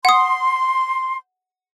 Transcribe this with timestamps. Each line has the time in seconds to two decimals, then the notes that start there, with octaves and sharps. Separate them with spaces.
0.05 F#5 C6 D#6